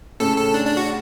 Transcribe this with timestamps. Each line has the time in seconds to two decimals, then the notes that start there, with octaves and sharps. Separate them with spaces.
0.20 A2 C#3 A4
0.37 A4
0.54 D4
0.66 D4
0.77 F#4